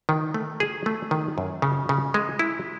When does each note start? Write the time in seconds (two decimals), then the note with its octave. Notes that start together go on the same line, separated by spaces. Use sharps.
0.09 D#3
0.34 A3
0.60 G#4
0.86 A3
1.11 D#3
1.38 F#2
1.62 C#3
1.89 C#3
2.14 G#3
2.39 E4